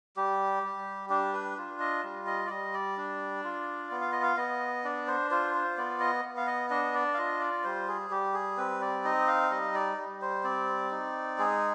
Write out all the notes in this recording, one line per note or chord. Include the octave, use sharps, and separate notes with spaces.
G3 G4
G3
D4 G4
B4
F4
D#5
G3
D#5
D5
G3 D#5
D5
D4
F4
B3
F5
D#5
F5
B3 D#5
D4 D5
C5
F4 C5
C5
B3 D5
D#5
B3
F5
D#5
D4 D#5
D5
F5
F4 D#5
D5
G3 C5
G#4
G3 G4
G#4
C4 B4
D5
D#4 D#5
F5
G3 D#5
D5
G3
C5
C4 D5
D#4
G#3 G#4